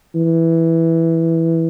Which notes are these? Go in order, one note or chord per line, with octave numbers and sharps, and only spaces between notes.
E3